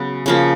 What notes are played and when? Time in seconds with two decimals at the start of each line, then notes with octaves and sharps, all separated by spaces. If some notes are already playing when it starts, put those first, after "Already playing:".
Already playing: C#3 F#3 B3
0.26 C#3 F3 A#3